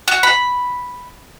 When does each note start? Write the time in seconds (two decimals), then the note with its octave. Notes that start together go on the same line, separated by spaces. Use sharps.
0.08 F#4
0.23 B5